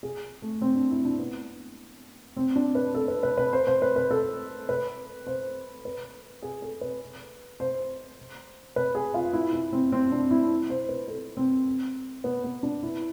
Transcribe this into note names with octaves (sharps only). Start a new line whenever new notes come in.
G#4
A3
C4
D4
E4
D4
B3
C4
D4
B4
A4
B4
B4
B4
C5
C5
B4
B4
A4
B4
C5
B4
G#4
A4
B4
C5
B4
G#4
F4
E4
E4
C4
C4
D4
E4
C5
B4
A4
C4
B3
B3
D4
E4